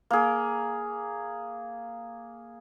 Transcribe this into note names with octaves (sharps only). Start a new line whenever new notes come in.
A#3 G#4